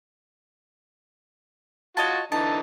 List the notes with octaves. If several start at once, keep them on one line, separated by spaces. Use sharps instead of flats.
F4 F#4 C#5 D#5 A5
D3 E3 D#4 A5